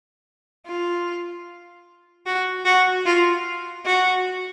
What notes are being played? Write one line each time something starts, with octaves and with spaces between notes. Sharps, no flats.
F4
F#4
F#4
F4
F#4